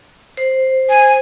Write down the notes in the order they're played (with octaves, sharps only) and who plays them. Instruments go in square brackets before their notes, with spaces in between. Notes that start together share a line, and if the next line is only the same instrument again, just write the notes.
[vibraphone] C5
[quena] G#5